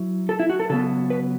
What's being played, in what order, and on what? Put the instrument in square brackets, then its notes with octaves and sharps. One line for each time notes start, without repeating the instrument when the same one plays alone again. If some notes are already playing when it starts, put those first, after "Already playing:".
Already playing: [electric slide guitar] F#3 E4
A4
E4
F#4
A4
C#3 F#3 B3 A4
B4